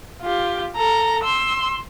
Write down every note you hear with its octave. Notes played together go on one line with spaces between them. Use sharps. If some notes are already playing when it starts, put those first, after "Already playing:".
F4 G4
A4 A#5
C6 E6